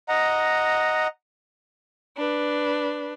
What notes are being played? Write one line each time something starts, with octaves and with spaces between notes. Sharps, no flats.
D#5 F#5 A#5
D4 B4